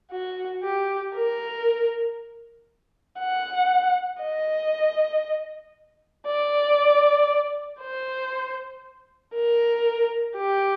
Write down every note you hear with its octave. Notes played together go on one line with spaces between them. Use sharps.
F#4
G4
A#4
F#5
D#5
D5
C5
A#4
G4